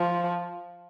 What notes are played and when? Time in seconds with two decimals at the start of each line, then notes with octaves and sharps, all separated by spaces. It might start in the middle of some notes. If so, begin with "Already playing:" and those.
Already playing: F3